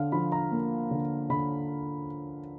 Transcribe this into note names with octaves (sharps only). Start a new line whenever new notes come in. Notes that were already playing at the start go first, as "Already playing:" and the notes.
Already playing: D3 F5
F3 B5
A#5
A#3
D3
D3 B5